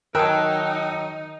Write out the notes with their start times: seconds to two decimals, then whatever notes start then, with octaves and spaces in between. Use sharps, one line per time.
0.15 D#3 F#3 D#4 A#4 G5 A5 E6 F#6